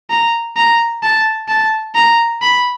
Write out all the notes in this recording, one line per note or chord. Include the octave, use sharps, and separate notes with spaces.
A#5
A#5
A5
A5
A#5
B5